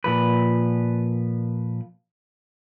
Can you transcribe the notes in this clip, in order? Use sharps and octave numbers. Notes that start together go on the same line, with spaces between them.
A#2 F3 B4